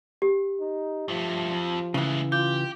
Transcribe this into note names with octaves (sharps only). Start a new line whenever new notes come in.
G4
D#4
G2 F3 A3
F2
C#3 E3 G#3 A3
F4 G4 G6